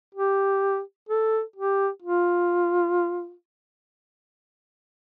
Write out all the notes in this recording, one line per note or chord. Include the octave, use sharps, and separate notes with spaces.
G4
A4
G4
F4